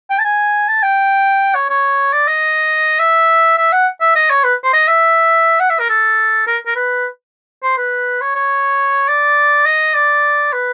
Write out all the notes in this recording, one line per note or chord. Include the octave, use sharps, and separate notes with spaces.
G5
A5
G#5
A5
G5
C#5
C#5
D5
D#5
E5
E5
F#5
E5
D#5
C#5
B4
C5
D#5
E5
F#5
E5
A#4
A4
A#4
A#4
B4
C5
B4
C#5
C#5
D5
D#5
D5
B4